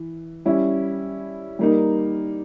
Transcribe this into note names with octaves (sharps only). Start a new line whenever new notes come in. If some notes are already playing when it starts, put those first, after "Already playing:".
Already playing: E3
G3 C#4 E4
G3 A#3 D#4